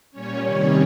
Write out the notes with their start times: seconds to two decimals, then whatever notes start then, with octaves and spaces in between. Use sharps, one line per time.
0.11 A#2 G3 C#4 C#5
0.42 C3 D#3 G3 C#4 C#5